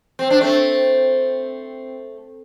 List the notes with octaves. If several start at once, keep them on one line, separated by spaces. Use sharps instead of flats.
C4
D4
A3 C4